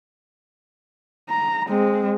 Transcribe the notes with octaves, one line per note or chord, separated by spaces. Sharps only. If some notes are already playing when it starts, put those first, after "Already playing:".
A#5
G#3 C4